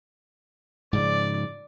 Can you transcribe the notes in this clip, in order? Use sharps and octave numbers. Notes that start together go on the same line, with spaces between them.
G#2 C#3 F3 D5